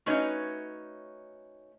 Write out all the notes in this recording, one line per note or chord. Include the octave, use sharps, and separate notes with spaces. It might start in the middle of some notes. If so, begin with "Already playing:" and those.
A3 C#4 D#4 F#4 B4 C#5